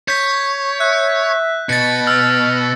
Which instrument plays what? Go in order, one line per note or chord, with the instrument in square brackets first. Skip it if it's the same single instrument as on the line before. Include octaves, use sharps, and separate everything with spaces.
[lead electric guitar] C#5 [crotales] G6 B6
[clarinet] E5 [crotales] F#6
[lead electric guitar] B2 [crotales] A6 C#7
[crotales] E6 [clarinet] F6